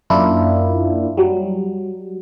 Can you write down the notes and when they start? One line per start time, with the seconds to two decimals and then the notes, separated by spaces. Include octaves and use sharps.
0.10 F#2 A#3 D4 E4 F4
1.17 F#3 G3